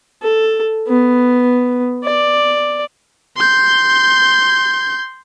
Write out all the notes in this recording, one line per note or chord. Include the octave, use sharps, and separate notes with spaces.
A4
B3
D5
C6 G6